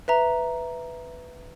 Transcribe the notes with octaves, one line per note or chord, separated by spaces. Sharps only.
B4 E5 A#5